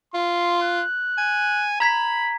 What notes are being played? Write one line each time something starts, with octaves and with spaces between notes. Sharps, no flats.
F4 C6
F#6
G#5
A#5 B5 G#6 B6